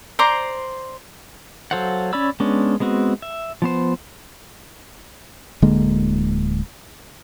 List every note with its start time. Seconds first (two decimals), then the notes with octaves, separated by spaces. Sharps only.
0.19 C5 D5 A#5 C6
1.71 F#3 A4 C5 F5 F#5
2.13 C#4 C#5 D5 B5 E6
2.40 G#3 B3 C#4 D4
2.80 G#3 B3 C4 F#4
3.22 E5
3.62 F3 B3 C5
5.62 D1 D3 G#3 A#3